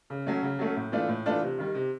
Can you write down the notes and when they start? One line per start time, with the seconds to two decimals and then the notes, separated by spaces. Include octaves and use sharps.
0.10 C#3
0.27 F#3 A3 C#4
0.42 C#3
0.59 F#3 A3 C#4
0.76 A2
0.92 E3 A3 D4 F4
1.09 A2
1.26 E3 A3 D4 F4
1.42 C3
1.59 D#3 G3
1.75 C3